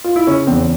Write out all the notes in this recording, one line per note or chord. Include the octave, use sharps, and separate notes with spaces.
F4
E4
C#3 C#4
E2 C4